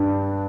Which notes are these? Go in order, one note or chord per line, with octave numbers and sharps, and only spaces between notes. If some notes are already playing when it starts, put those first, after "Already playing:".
Already playing: G2 D4